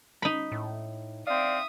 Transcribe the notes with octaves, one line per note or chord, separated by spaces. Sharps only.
D#4 B5
A2
C4 D5 E5 F5 D#6